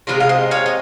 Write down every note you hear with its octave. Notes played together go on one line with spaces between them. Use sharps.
C3 F3 G#3 F4 G#4
F5
C5 D#5
C#5 F5
D#5